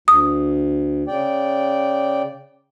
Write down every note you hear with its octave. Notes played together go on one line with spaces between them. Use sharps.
D2 D#6
C#3 D5 G5